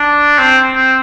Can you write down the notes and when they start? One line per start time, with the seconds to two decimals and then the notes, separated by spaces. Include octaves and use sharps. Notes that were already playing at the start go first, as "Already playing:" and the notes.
Already playing: D4
0.39 C4
0.75 C4